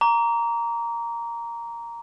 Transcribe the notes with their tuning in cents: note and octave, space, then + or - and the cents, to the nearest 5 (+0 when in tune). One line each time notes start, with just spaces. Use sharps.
A#5 +0 D6 -35